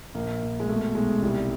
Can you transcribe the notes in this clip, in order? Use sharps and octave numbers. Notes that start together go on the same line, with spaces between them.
A#1 A#3
A#1
G#3
B2 A3
B1 G#3
C2 G3